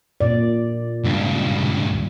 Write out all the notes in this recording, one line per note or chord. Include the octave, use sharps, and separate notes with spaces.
A#2 D5
C#2 G2